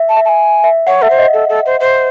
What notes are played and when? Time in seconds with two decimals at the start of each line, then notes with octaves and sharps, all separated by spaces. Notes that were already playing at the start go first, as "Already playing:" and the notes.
Already playing: E5
0.09 A5
0.17 E5
0.25 A5
0.29 G#5
0.64 E5
0.87 C#5 F#5
1.02 A4 E5
1.10 C5
1.18 D#5
1.33 A4
1.49 A4
1.66 C5
1.80 C5